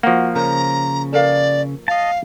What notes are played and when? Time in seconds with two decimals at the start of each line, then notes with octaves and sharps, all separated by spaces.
0.03 F3 A#3 F#4 F#5
0.35 C#3 A#4 C5 C#5 A#5
1.13 A4 A#4 D5 F5
1.88 D#5 F5 A5